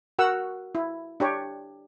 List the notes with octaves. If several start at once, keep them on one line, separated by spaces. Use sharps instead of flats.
F#4 A#4 F#5 E6
E4
D4 G4 C#5